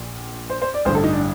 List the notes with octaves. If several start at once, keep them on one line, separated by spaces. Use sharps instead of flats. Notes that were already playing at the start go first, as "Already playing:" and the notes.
Already playing: A#1 A#2
C5
C5
D5
A1 G2 D3 C5
A4
D#4
D4